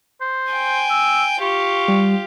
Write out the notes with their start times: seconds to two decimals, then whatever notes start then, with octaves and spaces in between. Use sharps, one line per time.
0.21 C5
0.53 G5 G#5
0.90 E6
1.41 F4 G4 C#6
1.88 G3